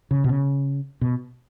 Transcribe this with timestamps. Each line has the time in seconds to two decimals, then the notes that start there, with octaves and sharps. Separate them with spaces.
0.11 C#3
0.24 B2
0.29 C#3
1.01 B2